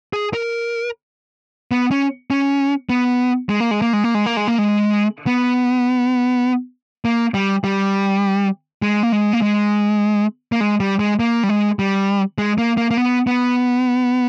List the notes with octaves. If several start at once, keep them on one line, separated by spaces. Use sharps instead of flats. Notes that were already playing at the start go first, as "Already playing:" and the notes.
G#4
A#4
B3
C#4
C#4
B3
G#3
A#3
G#3
A#3
G#3
A#3
G#3
A#3
G#3
A#3
G#3
B3
A#3
G3
G3
G#3
A#3
G#3
A#3
G#3
A#3
G#3
G3
G#3
A#3
G3
G#3
G3
G#3
A#3
A#3
A#3
B3
B3